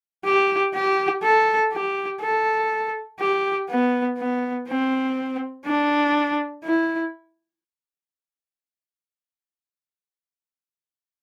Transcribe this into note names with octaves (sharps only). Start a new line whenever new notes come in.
G4
G4
A4
G4
A4
G4
B3
B3
C4
D4
E4